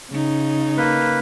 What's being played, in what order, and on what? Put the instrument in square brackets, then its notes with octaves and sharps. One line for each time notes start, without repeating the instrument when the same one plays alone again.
[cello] C#3 D#4
[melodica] A#3 B4